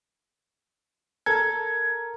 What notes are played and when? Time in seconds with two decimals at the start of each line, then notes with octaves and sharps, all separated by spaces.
1.26 A4 A#4 G#6